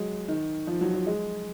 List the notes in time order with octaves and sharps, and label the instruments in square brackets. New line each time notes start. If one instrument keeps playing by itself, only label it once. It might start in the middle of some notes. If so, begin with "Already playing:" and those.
Already playing: [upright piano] F#3 G#3
D#3
F3
F#3
F3
G#3